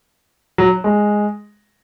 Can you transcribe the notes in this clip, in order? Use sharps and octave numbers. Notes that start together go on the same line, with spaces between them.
F#3
G#3